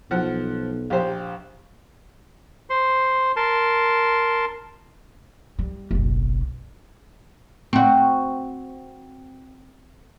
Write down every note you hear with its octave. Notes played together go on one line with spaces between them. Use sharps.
B1 F3 F#5
A#1 G4 C5
C5 C6
A#4 A5 C6
G3
F#1 B1
C4 F#4